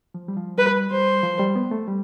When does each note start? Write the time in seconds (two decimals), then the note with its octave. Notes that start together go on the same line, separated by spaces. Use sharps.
0.14 F3
0.28 G3
0.37 F3
0.58 G3 B4
0.91 G3 C5
1.23 F3
1.39 G3
1.56 B3
1.71 A3
1.88 G3